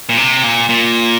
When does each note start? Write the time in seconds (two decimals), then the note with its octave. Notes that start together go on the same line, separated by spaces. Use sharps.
0.09 A#2
0.17 C3
0.43 A#2
0.69 A#2